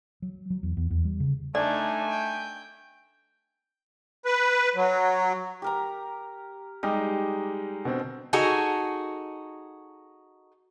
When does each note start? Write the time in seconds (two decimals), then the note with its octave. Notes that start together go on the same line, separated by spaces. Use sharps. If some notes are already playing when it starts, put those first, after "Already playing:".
0.22 F#3
0.50 F#3
0.63 E2
0.77 E2
0.91 E2
1.05 G3
1.20 C#3
1.55 A3 D4 D#4 D5 G#5
2.10 G5
4.25 B4
4.75 F#3
5.62 G4 A#4 A#5
6.83 G3 G#3 D#4 G4
7.85 B2 D3 C4
8.33 D#4 F#4 G#4 A4